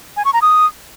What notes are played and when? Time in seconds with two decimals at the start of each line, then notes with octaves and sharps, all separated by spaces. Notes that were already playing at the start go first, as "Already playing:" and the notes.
0.17 G#5
0.25 C#6
0.33 A#5
0.42 D#6